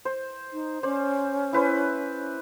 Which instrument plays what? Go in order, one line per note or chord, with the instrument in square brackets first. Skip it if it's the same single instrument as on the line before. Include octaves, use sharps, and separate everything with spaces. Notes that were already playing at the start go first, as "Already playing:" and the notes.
[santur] C5
[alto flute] D#4
[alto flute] C#4 [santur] C5 D5
[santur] E4 B4 C5